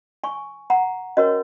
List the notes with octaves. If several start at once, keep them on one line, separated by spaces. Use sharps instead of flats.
G#5 C#6
F#5 A#5
C#4 F#4 A#4 C#5 D#5